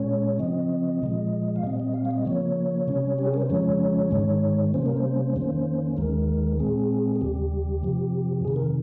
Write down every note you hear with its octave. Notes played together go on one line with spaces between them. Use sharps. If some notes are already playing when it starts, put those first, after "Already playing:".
Already playing: A#2 G#3 C#4 C#5
C#3 F3 C4 D#5
A#2 F3 G#3
F5
A#2 G3 C4 D#5
D#5
F5
F5
D#5
C#3 F3 A#3 C#5
C3 G3 C#4
G4
G#4
A#4
C5
F2 C#3 F3 G#3 C#4 C#5
G#2 D#3 G#3
C3 G3 A#3 C#4 C5
A#4
C5
F2 D#3 A#3 C#4
D#2 D#3 G#3 A#4
A#2 G#3 C4 G#4
G#4
D#2 C#3 G3 G4
F2 C3 F3
F2 C3 D#3 G#4
A#4